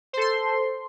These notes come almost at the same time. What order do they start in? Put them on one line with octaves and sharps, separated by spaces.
C5 A4 C6